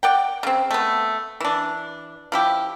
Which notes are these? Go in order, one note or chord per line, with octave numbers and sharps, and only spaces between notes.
D5 F#5 G5
C#3 C4
A3 B3
E3 D4
F3 E4 G4